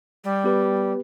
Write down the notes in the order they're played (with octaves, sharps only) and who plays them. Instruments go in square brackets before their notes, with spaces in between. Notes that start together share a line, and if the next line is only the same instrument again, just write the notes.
[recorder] G3
[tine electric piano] B3 G4 B4